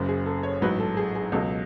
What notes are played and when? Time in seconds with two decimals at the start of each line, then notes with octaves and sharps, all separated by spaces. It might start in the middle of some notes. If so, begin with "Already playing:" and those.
Already playing: F#1 F#2 C#3
0.09 G#4
0.26 A4
0.43 C#5
0.61 A1 G#2 F#3 B4
0.80 A4
0.97 G#4
1.15 G#4
1.32 C#2 B2 F#3 A4